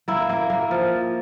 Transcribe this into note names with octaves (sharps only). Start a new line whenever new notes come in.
A#3 E4
A#3
A#3
F3